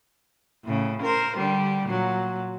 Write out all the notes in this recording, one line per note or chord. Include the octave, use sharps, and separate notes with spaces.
A2 C#3
A#4 C5
D3 G3
A#2 F#3